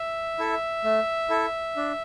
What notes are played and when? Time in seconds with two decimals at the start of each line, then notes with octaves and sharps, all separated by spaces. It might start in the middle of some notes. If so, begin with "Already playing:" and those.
Already playing: E5
0.39 E4 A4
0.84 A3
1.30 E4 A4
1.76 D4